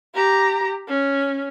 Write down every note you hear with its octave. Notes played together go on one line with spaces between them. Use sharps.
G4 A#5
C#4